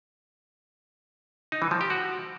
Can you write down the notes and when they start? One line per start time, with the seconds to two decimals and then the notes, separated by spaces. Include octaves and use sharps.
1.52 D#4
1.62 E3
1.71 F3
1.81 G4
1.90 F#4